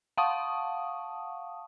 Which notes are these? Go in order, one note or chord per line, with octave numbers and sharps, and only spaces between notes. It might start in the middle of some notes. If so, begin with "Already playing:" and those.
F5 F#5 A5 C#6 D#6